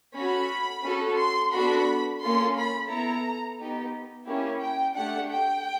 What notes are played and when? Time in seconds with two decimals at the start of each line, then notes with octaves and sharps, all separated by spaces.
0.16 C#4 F#4 A4 B5
0.85 C#4 F#4 A4
1.19 C6
1.53 B3 D4 F#4 A4 B5
2.21 A#3 C#4 F4 A4 C6
2.56 B5
2.89 B3 E4 A4 A#5
3.58 B3 D#4 G4
4.27 A#3 C#4 E4 G4
4.61 G5
4.94 A3 D4 G4 F#5
5.29 G5